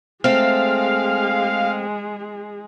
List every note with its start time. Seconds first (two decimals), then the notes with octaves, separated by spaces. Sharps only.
0.24 G#3 A3 C4 G#4 F5